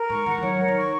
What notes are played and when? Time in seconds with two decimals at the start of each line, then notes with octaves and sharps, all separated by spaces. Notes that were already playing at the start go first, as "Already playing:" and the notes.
Already playing: A#4
0.09 G#2 C#6
0.26 D#3 F#5
0.38 D#3
0.43 F#3 C#5
0.59 A#4
0.68 D#3
0.77 C#6